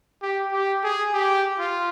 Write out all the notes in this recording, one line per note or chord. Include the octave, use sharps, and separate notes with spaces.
G4
G4
G#4
G4
F4